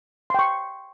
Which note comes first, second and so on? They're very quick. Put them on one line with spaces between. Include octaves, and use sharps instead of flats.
C6 G5 C#6